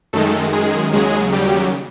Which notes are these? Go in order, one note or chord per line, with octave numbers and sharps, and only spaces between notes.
F#2 D#3 G#3 A3 A4
G#3 G#4
D#2 C#3 F#3 G#3 G#4
G3 G4